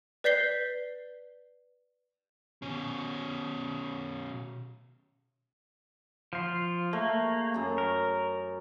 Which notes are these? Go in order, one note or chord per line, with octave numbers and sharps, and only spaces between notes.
B4 D5 G6 B6 C7 G7
B2 C#4
F3 F4
A3 A#3
F#2 A#5
A#4